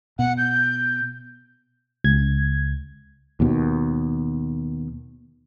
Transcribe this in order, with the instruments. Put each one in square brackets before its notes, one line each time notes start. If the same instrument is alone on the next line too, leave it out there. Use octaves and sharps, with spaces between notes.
[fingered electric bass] B2 [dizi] F#5
[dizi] G6
[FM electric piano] C#2 G#6
[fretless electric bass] D#2 B2